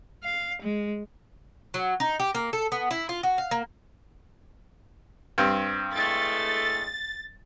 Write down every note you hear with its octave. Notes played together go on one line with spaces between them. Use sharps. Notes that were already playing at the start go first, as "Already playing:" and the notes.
F5
G#3
F#3
D#4
G4
A#3
A4
B3
E4
F4
F#4
F5
A#3
G2 C4
A2 G#3 A3 A6